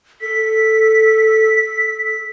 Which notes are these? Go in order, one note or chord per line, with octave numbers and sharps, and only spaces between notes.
A4 B6